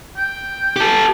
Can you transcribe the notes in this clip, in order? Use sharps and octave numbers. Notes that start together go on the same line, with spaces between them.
G5
G4 A4